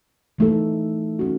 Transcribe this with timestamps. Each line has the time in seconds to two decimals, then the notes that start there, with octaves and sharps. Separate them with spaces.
0.38 E3 A3 D#4 A4
1.19 C#4 F#4